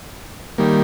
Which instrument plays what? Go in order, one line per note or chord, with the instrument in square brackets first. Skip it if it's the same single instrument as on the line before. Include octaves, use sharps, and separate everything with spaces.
[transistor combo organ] D#3 G3 A#3